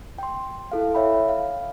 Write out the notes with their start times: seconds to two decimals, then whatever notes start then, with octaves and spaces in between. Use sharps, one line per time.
0.18 G5 C6
0.72 E4 A4 F5
0.95 C#5 E5 G5 B5
1.29 F5